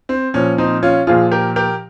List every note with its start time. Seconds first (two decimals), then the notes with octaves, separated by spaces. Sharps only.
0.09 C4
0.34 A#2 F3 C#4
0.58 C4 D#4
0.83 C#4 F4
1.07 A#2 F3 F4 G#4
1.32 G4 A#4
1.56 G4 A#4